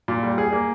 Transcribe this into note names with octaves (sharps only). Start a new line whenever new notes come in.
A#2
G3
G#4
A#3